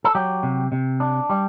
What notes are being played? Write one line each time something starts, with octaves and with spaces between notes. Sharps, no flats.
A4
F#3 G4
C3
C3
D4
G3